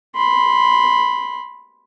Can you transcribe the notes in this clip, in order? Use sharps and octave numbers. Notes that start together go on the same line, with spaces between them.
B5 C6